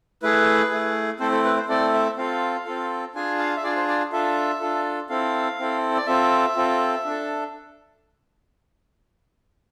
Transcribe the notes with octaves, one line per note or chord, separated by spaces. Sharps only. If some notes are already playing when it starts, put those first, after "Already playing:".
A3 E4 G#4 B4
A3 E4 G#4
A3 C4 E4 A4 C5
A4
B4
C5
A3 C4 E4 A4 D5
E5
C4 F4 A4 F5
C4 F4 A4
D4 F4 G#4 G#5
F5
E5
D4 F4 G#4 D5
C5
D5
D4 F4 A4 E5
D4 F4 A4
C4 E4 A4 F5
C4 E4 A4
D5
C4 F4 A4 E5
C4 F4 A4
D4 A4